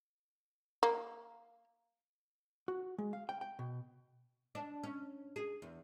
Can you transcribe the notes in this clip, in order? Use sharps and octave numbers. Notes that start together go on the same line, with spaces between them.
A#3
F#4
G#3
F5
G5
G5
B2
D4
C#4
G#4
E2